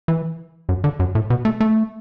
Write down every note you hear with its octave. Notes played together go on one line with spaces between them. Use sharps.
E3
F#2
D3
F#2
A2
B2
A3
A3